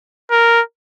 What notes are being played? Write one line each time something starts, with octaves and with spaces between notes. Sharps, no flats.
A#4